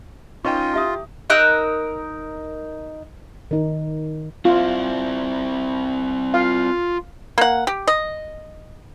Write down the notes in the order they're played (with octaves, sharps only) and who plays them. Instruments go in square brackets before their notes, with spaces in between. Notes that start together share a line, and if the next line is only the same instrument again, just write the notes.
[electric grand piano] C#4 D#5 G5 [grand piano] D#4 [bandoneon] F4 [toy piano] B4 C#6
[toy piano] E4 E5 D#6 [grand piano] G4
[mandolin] D#4 A#4 E6 F#6
[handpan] D#3 D#4
[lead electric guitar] C4 E4 [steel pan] F4
[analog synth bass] F4 [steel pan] F5
[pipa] A#3 F#5
G4
D#5